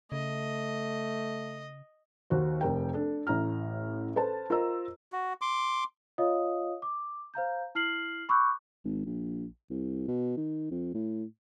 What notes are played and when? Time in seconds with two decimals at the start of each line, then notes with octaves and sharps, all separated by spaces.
0.12 C#3 A3 D#5
2.30 D#2 F#4 C5
2.61 F1 A#4 G5
2.93 D4 A4
3.27 A1 A2 A#5 F6
4.16 A4 B4 C5 A5
4.50 F4 A#4 C5 D#5 A#5 E6
5.12 F#4
5.41 C6 D6
6.18 F4 C#5 D#5 F5 D#6
6.82 D6
7.34 C5 F5 A#5 G6
7.75 E4 F6 C7 F#7
8.29 B5 C#6 D6 E6 F#6 G6
8.84 G#1
9.06 A#1
9.70 C2
10.08 B2
10.37 D#3
10.71 F2
10.94 A2